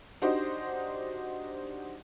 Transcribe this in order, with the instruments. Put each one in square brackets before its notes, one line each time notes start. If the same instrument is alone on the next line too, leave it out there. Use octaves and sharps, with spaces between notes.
[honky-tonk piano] D4 D#4 F#4 G4 C5 D#5